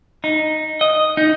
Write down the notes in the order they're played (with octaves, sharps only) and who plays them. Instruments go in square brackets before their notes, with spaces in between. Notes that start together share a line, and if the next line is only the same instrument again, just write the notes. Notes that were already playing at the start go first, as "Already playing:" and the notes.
[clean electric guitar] D#4
D#5
D#4